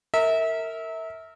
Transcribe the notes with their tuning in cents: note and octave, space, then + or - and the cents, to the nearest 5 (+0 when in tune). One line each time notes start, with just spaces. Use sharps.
A#4 -25 E5 -25